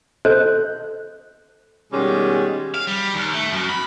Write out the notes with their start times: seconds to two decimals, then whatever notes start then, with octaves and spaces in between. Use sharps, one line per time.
0.25 A4 C5 D#5 F#6 G6
1.92 B2 D#3 G3 G#3 C#4
2.74 F5
2.87 G3
3.14 D#2
3.33 A3
3.52 F#2
3.69 B5